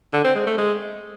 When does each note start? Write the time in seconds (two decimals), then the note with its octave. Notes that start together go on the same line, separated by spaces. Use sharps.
0.13 D3
0.24 C4
0.35 G#3
0.47 A3
0.58 G#3